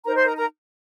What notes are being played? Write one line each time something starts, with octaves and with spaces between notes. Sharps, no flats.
D#4 A#4 C5 A#5
C5 C6
A#4 A#5
A#4 A#5